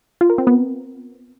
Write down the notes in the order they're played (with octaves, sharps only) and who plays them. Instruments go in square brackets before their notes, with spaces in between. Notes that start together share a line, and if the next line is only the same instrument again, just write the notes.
[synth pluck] F4
A#4
C4
B3